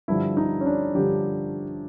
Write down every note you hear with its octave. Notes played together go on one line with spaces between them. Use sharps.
G2 D3 F3 E4
D#4
C#4
D4
G2 D3 F3 G4